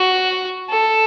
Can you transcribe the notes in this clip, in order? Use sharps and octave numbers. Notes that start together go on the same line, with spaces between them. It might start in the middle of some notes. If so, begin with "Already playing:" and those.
Already playing: F#4
A4